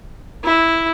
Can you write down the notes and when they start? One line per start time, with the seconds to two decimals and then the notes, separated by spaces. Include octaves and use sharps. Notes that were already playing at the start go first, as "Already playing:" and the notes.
0.44 E4